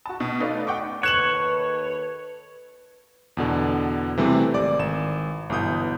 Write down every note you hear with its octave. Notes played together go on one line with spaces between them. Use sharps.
F#4 A5
B2
A3 D#4 B4 D5 F5
F#5 G5 C#6 D6
D#2 A4 B4 C#5 F#6 E7 F#7
E2 B2 D3
C3 E3 G3 A3 C4
G#1 D5 D6
G#1 E7
G1 B2 E3 D#6 G6